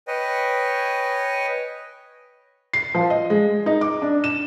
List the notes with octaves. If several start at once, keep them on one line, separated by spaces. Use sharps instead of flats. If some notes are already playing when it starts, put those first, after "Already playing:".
B4 C#5 D#5 G5 G#5
C7
F3
D#5
G#3
D#4
D6
D4
E7